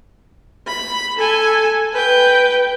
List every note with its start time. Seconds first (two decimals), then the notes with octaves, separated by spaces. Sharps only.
0.67 B5
1.17 A4 G#5
1.93 B4 G5